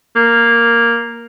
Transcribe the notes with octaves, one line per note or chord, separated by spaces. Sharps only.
A#3